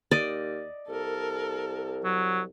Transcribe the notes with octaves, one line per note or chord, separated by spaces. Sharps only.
D#2 D5 D#5
C2 A4 A#4
F#3